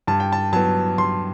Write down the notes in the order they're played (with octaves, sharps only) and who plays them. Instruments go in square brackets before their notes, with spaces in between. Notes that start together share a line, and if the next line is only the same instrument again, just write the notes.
[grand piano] G2 A5
G5
A5
F#3 B3 A5
G2 C6